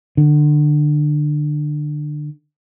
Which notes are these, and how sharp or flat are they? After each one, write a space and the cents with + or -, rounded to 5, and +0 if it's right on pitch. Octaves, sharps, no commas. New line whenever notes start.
D3 +25